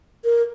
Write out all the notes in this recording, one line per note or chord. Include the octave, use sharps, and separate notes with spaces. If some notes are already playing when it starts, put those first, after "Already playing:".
A#4